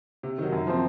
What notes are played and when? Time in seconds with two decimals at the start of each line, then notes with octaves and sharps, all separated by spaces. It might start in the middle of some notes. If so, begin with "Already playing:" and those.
0.23 C3
0.38 D#3 F#3
0.52 F#2
0.67 F3 C4